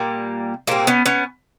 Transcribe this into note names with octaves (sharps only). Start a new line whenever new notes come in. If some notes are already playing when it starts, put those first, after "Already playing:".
Already playing: A#2 G3 A#3
A#2 G3 A#3 C4
B3 C#4
B3 C#4